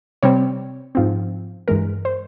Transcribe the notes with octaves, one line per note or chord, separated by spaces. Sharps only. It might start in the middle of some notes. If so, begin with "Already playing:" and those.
C3 G3 C4 C#5
G#2 F3 C4
G2 E3 G#3 A#4
C5